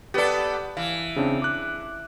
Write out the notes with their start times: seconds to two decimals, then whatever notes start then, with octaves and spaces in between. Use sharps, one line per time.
0.14 B3 G4 A4 B4 D5
0.77 E3 F5
1.16 C#3 C4 D4
1.42 D6 F#6